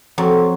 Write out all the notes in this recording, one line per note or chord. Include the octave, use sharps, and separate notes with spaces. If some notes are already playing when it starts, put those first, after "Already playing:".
F2 F#3